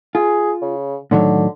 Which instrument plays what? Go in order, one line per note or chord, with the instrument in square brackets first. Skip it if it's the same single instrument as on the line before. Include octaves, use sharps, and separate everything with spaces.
[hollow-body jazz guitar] F4 [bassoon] G#4
[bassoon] C#3
[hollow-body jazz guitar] A2 D#3 F#3 [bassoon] D3